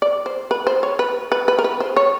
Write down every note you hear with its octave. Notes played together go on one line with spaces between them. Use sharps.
D5
C5
B4
C5
C#5
B4
B4
B4
A#4
B4
C5
C#5